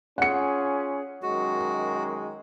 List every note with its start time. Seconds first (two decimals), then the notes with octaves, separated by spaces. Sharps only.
0.18 C#4 F4 G#4 F#5 C#7
1.23 F#2 D#3 G#3 F#4